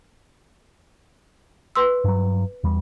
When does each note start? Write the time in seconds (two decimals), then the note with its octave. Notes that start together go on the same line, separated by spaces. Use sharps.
1.75 B4 C6 E6
2.04 G2 F#3
2.64 E2 G3